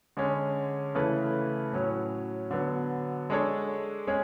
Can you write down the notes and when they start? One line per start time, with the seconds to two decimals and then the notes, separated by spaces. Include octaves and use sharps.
0.17 D3 G#3 C#4
0.95 C#3 E3 A3 E4 B4
1.73 A2 F#3 C#4
2.51 D3 F#3 B3
3.30 G#3 D4 A4 C#5
4.07 G#3 C#4 G#4 C#5